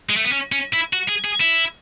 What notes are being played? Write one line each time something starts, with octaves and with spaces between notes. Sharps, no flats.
G#3
A3
B3
C#4
C#4
E4
F#4
G#4
G#4
E4